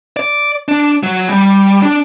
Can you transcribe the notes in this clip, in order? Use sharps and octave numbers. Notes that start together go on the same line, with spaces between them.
D5
D4
F#3
G3
D4